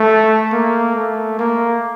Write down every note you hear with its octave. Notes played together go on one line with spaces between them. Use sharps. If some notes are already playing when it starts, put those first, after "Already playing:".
Already playing: A3
A#3
A3
A#3